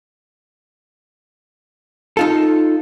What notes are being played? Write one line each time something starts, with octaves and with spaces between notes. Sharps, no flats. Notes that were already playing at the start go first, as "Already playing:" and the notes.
D#4 F4 A4